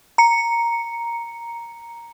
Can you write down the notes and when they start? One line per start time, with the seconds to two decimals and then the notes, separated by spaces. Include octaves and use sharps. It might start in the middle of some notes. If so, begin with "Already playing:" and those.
0.18 A#5 C#7